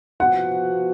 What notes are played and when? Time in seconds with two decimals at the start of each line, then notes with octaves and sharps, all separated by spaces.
0.20 F3 B3 F#4 F#5